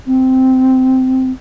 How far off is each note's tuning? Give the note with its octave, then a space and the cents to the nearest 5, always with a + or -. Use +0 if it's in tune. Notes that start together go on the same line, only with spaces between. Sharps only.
C4 -10